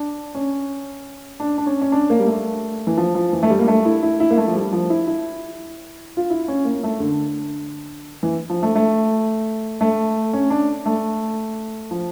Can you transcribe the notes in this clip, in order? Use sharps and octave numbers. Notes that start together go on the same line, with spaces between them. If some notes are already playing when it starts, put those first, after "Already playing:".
Already playing: D4
C#4
D4
D4
C#4
C#4
D4
A#3
G3
A3
E3
F3
F3
E3
A3
G3
A#3
A3
E4
E4
E4
A#3
A3
F3
G3
F3
E4
E4
F4
E4
C#4
A#3
A3
D3
E3
F3
A3
A3
A3
C#4
D4
A3
F3